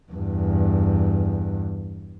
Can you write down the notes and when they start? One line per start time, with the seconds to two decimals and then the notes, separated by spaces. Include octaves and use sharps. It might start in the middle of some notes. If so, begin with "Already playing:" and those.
0.12 E2 G2